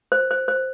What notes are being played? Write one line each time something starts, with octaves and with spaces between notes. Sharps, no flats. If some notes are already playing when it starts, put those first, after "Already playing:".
C5
C5
C5